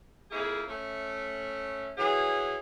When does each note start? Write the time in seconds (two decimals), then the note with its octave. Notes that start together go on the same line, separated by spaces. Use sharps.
0.31 F2 A#3 E4 G#4
0.68 A3 C#4
1.98 E3 F#3 G#4